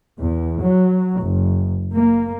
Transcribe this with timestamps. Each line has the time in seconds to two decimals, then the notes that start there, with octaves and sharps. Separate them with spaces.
0.19 E2
0.61 F#3
1.21 F#1
1.94 A#3